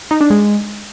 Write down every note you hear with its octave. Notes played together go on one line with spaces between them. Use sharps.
D#4
D4
G#3